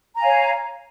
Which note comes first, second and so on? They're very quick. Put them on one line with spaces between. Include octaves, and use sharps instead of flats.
A#5 G#5 F5 C#5